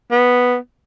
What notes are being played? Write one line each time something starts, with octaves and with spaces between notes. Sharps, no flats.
B3